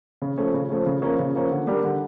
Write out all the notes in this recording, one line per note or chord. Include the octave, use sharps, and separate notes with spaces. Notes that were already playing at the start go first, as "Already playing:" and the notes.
C#3
F3 A3 C#4
C#3
F3 A3 C#4
C#3
F3 A#3 C#4
C#3
F3 A#3 C#4
D3
G3 D4 G4 A#4
D3